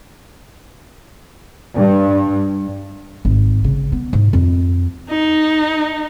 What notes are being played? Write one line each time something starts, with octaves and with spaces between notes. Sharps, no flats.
G2
G#1
C#3
B3
G#2
F2
D#4